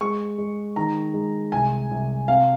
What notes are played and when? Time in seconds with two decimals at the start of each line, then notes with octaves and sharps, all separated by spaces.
0.01 G#3 C#6
0.38 G#3
0.76 D#3 A#5
1.14 G#3
1.52 C2 G#5
1.91 C2
2.28 C3 F5